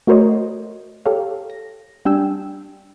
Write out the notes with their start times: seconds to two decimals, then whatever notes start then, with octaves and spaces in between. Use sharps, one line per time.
0.07 A3 F#4 A#4 C5 C#5 D#5
1.06 G4 A4 A#4 C#5 F5
1.50 A#6
2.05 G3 D4 G5 G#5 E6